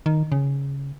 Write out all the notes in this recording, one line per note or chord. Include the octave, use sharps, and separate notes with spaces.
D#3
C#3